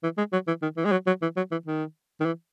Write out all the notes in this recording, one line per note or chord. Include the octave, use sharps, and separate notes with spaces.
E3
G#3
F#3
E3
D#3
E3
G#3
F#3
F#3
E3
F#3
E3
D#3
D#3
E3